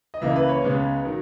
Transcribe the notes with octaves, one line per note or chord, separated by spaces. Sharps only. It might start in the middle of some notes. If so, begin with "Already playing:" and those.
D#5
C#2 C#3 E3 A#3 E5
B4
C#5
C#2 C#3 G#3 B3
D#3 F#3